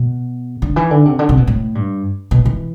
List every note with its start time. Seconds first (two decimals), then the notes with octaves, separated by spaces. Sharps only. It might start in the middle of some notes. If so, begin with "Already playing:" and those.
Already playing: B2
0.62 D3
0.76 E3
0.91 D3
1.05 C3
1.19 D3
1.29 C3
1.37 B2
1.47 A2
1.75 G2
2.31 B2
2.46 E3